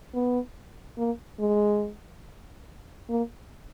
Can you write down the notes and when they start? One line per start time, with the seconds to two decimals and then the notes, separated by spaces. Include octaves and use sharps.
0.14 B3
0.98 A#3
1.40 G#3
3.09 A#3